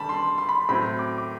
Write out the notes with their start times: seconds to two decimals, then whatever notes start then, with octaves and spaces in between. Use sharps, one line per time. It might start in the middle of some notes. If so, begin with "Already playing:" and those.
Already playing: D3 G3 A5 B5
0.09 C6
0.38 C6
0.49 B5
0.69 A2 F#3 C4 B5
0.99 D6
1.18 D6